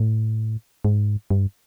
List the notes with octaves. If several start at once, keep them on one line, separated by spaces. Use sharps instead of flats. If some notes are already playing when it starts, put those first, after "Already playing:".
Already playing: A2
G#2
G2